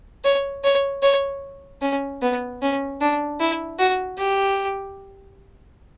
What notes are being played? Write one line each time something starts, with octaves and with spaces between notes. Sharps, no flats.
C#5
C#5
C#5
C#4
B3
C#4
D4
E4
F#4
G4